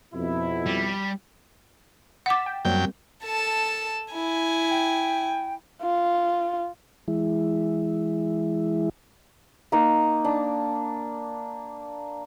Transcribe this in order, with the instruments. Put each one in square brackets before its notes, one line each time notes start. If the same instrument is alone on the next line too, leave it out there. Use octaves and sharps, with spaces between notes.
[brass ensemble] F2 B2 E4
[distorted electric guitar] G3
[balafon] F#5 D6 [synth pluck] A6 B6 E7
[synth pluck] G5
[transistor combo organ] F#2 G5 [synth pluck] G3 A#3 C4
[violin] A4 A5
[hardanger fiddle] E4 [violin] G#5
[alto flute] G5
[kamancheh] F4
[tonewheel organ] E3 G#3 E4
[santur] A#3 D#4
D4